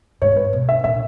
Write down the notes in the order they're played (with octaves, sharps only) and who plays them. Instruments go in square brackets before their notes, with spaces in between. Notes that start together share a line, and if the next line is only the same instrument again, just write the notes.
[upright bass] G#2 [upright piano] C#5
[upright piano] B4
[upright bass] B2
[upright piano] E5
[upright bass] A#2 [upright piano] E5